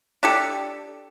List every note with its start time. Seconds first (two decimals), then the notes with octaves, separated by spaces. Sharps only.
0.23 D4 G4 A4